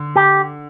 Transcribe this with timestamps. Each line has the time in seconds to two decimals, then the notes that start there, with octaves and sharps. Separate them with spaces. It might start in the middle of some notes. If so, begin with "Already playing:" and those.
Already playing: D3
0.16 G4